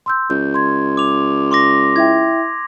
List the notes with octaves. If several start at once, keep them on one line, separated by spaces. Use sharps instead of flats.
C6 E6 G6
C#2 G6
C6 G#6
D6 F7
C6 D6 A#6
E4 E5 G5 G#6